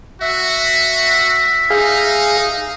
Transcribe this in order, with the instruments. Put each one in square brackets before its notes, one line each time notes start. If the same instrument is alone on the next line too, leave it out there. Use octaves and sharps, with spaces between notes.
[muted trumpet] F#4 [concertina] E5
[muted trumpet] D#4 [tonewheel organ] G#4 F5